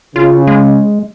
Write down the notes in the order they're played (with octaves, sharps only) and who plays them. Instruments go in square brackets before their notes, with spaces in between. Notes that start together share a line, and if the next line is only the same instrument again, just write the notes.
[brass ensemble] C#3 [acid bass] F4
[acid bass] G#3